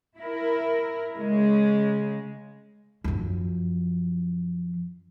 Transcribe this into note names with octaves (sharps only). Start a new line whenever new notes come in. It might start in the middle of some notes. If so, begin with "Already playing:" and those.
E4 A#4
C#3 G#3
F#2 F3